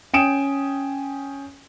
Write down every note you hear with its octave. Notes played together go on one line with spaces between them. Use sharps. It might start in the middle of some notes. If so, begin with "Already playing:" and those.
C#4 G5 G#5 D#6 D7 E7